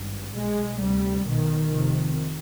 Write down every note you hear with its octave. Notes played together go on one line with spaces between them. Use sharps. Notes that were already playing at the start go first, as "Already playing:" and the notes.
Already playing: G#1 G2
B1 B2 G#3
D2 C3 G3
B1 B2 D#3
F1 F2 C3